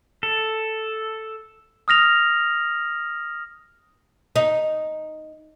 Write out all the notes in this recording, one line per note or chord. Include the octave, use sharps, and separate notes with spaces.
A4
D#6 F6 A#6 F7
D#4